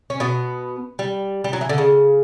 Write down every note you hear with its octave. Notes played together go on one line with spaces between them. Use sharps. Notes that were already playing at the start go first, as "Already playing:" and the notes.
C#4
B2 B3
G3
G3
F#3
E3
D3
C#3